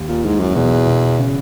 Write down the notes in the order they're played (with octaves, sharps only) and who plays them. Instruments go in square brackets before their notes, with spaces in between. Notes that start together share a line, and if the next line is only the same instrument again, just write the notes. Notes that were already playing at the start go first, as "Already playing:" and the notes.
Already playing: [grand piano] D#2
[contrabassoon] A#2
[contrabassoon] G#2 [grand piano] E3
[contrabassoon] F#2
[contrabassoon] E2 [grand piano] B2
[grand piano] B2
C#3